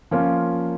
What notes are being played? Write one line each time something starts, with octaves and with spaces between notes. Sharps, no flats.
F3 A#3 C#4 F4